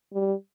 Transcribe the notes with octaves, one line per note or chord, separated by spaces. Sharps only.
G3